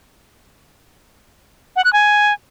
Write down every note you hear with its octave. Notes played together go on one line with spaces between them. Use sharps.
F#5
F#6
G#5